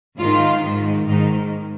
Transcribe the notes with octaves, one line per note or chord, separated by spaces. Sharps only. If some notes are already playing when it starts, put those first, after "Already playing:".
G#2 D#3 F4
G#2 D#3
G#2 D#3 D#4